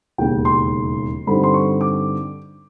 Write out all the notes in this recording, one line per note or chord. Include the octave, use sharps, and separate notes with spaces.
E1 D#2 C#3 G5
C6
G2 D3 G3 C4 D#4 B5
C6
C#6
D6